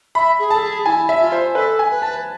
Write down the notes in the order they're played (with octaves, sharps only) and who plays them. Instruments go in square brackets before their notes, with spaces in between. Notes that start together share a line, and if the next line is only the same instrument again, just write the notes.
[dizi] E5 [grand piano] B5
[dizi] G#4
[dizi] A4 [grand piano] A5
[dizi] G#4
[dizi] E4 [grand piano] G#5
[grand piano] E5
[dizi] F4
[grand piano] C5
[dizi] A4 [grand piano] B4
[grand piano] G#5
[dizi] B4
[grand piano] A5